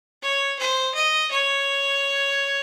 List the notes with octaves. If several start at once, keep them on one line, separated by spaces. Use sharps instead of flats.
C#5
C5
D#5
C#5